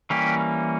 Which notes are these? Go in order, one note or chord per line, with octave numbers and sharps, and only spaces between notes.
E3 G3 A#3 C#4 G4